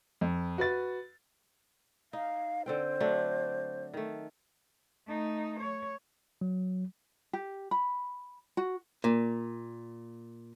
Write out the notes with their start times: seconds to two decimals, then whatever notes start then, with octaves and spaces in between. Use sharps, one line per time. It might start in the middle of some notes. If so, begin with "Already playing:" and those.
0.21 F2
0.58 F#4 B4 A6
2.13 D#4 F5
2.66 D3 C4 C5 G5
3.00 F#3 A3 D4
3.94 D#3 A3
5.07 A3 D#4
5.61 C#5
6.41 F#3
7.33 G4
7.71 B5
8.57 F#4
9.04 A#2